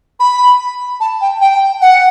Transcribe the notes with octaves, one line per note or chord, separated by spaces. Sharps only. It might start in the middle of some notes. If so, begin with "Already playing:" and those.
B5
A5
G5
G5
F#5